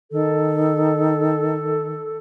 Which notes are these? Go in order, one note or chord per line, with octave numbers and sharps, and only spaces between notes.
D#3 A4